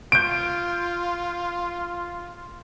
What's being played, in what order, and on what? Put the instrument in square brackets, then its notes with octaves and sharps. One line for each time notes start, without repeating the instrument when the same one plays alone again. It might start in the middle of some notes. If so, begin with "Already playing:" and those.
[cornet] F4 [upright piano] G6 D7